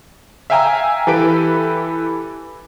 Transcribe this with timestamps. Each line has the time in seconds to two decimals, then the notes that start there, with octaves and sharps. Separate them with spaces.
0.50 E5 F5 G5 G#5 A#5 E6
1.07 E3 G4 A4 B4 B5 D7